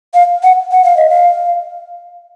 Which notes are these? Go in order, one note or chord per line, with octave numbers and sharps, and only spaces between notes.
F5
F#5
F#5
F5
D#5
F5